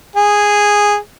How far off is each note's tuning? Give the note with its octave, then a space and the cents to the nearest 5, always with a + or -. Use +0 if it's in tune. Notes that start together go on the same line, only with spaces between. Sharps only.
G#4 -10